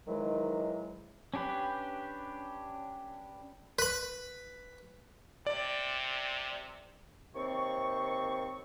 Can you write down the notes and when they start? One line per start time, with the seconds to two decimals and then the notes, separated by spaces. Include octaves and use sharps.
0.07 G#2 D#3 E3 F#3 G#3
1.34 C#4 D4 G4 B4
3.79 B4 B5
5.47 C3 D5
7.35 D#2 C3 C4 C#6